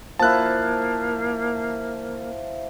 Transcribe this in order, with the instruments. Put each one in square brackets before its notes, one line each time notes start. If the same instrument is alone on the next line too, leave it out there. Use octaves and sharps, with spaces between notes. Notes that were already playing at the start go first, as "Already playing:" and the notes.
[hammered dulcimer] F3 E4 [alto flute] A#3 [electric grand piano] A5 F#6